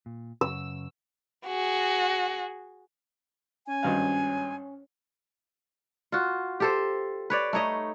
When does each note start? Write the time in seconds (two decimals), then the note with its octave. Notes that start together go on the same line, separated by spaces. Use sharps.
0.06 A#2
0.41 F#2 C#3 E6
1.46 F#4 G#4
3.67 C#4 G#5
3.83 G#1 G2 F5
6.12 F4 F#4
6.60 G4 A4 C5
7.30 B4 C#5 D5
7.53 A3 D#4 C#5 D#5